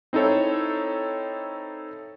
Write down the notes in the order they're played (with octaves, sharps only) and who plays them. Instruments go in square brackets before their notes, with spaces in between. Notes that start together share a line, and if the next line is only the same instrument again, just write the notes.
[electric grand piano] C4 D#4 E4 A4 C#5